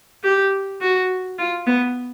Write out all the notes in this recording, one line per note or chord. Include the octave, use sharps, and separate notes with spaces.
G4
F#4
F4
B3